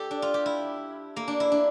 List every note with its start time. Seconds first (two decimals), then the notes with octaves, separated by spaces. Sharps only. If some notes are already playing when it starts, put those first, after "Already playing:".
Already playing: G4 A4 D5
0.11 D4
0.22 F4
0.34 G4
0.46 E4
1.16 A#3
1.28 D4
1.40 E4
1.52 D4